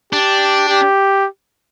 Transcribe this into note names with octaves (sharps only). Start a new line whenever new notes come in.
D4 G4
G4